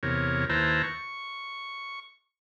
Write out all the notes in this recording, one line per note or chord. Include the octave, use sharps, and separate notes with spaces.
E2 C3 A#4 C#5
D#2 E4 B4 C5 A5 A#5
C#6